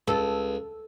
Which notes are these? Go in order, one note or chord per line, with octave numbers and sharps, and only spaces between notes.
C#2 A4